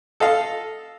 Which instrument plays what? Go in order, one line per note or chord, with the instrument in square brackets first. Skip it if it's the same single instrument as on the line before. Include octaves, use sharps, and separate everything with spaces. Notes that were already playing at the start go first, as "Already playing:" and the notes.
[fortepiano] A4 D#5 F5